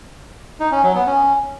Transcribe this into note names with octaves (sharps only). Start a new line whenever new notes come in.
D#4
C#4
F#3
B3
C#4